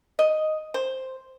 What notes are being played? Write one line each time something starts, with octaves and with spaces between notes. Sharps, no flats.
D#5
C5